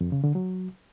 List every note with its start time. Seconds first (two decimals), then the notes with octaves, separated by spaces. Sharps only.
0.01 F2
0.12 C#3
0.24 D3
0.35 F#3